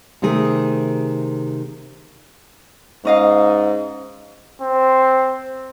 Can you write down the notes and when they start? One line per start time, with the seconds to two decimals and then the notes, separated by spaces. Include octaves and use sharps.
0.22 C3 D#3 A3 G#4
3.05 G#2 C#4 D#5 F5
4.61 C4